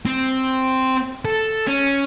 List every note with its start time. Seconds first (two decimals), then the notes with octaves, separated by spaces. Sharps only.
0.06 C4
1.25 A4
1.67 C#4